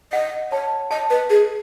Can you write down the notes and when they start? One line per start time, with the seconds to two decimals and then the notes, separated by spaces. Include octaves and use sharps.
0.12 D#5 F#5
0.52 C#5 A5
0.91 D#5 A5
1.10 B4
1.30 G#4